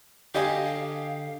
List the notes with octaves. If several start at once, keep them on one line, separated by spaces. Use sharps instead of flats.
D3 G4 D#5 F5 G#5
F5